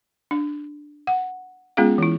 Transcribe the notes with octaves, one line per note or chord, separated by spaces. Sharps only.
D4
F#5
G#3 B3 C#4 F4 G#4 F5
E3 E4